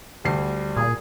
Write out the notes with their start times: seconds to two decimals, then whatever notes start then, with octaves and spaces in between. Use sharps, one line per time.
0.25 D2 G3 C7
0.77 A#2 G#4